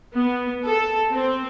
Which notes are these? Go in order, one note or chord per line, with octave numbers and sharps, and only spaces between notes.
B3
A4
C4